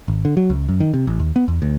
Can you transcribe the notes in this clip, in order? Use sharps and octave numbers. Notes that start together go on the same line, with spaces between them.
G#1
D3
F#3
C#2
F#2
D#3
C3
A1
D#2
B3
E2
D2